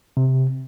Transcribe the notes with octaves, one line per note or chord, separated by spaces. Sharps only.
C3